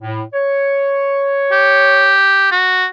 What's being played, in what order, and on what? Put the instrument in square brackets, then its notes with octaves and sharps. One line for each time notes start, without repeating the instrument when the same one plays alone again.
[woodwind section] A2
C#5
[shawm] G4
F#4